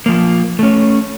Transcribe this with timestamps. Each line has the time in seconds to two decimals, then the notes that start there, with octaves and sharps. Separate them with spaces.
0.06 F3 A#3
0.59 A3 C#4